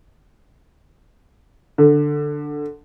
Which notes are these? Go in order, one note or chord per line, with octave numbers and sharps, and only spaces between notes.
D3